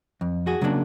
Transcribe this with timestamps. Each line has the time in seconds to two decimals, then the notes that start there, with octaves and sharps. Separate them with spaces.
0.21 F2
0.47 F#4 G#4
0.61 C#3 F#3 A#3 D4